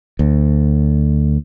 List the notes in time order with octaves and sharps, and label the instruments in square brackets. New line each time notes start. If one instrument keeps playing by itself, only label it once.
[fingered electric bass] D2